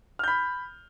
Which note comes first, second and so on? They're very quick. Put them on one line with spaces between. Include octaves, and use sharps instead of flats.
F6 G6 B5